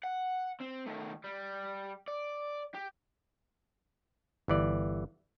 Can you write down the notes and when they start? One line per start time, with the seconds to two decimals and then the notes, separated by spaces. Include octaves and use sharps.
0.03 F#5
0.61 C4
0.86 D#3 A3
1.24 G3
2.08 D5
2.74 G4
4.48 G1 E3 D5